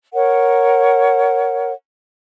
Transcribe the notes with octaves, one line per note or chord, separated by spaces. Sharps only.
A#4 C#5 F#5